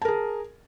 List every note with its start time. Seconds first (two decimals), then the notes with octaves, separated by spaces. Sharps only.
0.02 A5
0.05 A#4
0.08 G#4